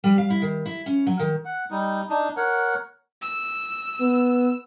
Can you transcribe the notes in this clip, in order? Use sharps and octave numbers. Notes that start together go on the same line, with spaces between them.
G3
F5
E4
D#3
E4
C#4
F#3
D#3
F#5
G3 D#4
D4 D#4
A#4 C#5 F#5
E6
B3